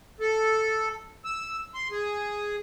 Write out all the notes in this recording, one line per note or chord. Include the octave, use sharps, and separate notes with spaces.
A4
E6
C6
G#4